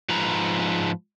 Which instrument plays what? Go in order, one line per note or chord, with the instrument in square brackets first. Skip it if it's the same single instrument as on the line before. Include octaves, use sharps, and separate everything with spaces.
[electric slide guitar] G#2 F3 B4 A#5